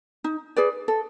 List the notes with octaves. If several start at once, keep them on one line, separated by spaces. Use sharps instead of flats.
D#4
G#4 B4 D5
A4